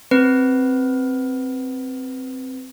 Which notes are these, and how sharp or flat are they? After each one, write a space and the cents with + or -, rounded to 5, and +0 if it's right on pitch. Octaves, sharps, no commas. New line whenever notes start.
C4 +0 B4 +0